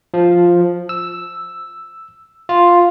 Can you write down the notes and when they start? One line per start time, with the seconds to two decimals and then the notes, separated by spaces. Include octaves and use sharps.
0.14 F3
0.89 E6
2.49 F4